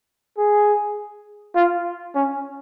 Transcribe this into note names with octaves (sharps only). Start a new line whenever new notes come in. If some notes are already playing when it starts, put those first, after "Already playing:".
G#4
F4
C#4